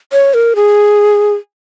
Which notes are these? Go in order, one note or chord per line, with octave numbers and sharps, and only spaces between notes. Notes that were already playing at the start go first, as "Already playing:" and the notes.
C#5
A#4
G#4